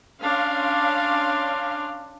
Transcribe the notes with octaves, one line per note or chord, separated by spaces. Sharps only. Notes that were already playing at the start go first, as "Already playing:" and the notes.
C#4 D4 F5 C6